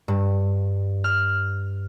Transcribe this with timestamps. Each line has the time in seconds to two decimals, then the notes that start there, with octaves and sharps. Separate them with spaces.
0.08 G2
1.04 F6